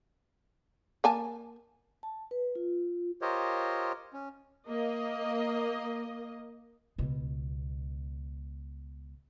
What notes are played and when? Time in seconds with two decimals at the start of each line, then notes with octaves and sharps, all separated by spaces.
1.04 A#3 G#5 A5
2.03 A5
2.31 B4
2.55 F4
3.22 F4 G4 A#4 C5 C#5 D#5
4.13 C#4
4.67 A#3 D#5
6.98 C#2 B2